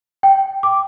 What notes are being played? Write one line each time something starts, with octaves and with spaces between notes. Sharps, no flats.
G5
D6